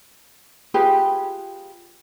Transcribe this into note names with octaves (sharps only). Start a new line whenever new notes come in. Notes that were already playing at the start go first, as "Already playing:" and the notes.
F4 G4 G#4 B4